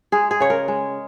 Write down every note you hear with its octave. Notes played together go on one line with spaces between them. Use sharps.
G#3 G#4
G#4
C#3 C#5
A#4
G#3